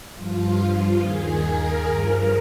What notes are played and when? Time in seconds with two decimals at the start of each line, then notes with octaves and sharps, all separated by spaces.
0.14 G2 F3 F4
1.00 D#2 D#3 G#4
1.44 A#4
1.87 G2 F3